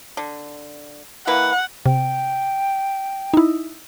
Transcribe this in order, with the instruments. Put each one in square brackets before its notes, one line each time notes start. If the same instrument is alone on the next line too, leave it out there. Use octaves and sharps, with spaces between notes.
[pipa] D3
[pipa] E3 A#3 B4 [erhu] F#5
[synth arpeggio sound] C3 [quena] G5
[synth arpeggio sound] D#4 E4